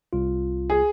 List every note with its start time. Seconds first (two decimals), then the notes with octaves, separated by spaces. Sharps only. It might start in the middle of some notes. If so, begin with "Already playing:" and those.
0.13 C2 F4
0.70 G#4